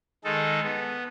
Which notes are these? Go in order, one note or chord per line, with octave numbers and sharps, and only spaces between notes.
D#3 G#3 D#4 A4
B3